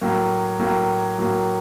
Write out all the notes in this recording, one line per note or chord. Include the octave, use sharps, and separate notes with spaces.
A2 F#3 A#3
A2 F#3 A#3
A2 F#3 A#3